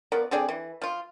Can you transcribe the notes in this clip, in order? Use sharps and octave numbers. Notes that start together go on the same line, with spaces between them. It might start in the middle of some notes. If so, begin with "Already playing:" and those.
F3 B3 A#4 D5
D3 C4 G#4 D5
E3
F3 F4